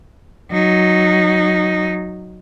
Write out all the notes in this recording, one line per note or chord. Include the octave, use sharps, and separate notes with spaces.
F#3 D#4